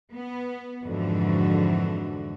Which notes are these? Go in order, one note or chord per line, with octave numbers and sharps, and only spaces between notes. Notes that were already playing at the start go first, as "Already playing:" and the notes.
B3
F2 G#2 D3 E3 D4 F#4